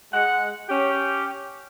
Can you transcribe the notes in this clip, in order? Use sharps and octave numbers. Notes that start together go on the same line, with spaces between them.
G#3 F#5
C#4 G4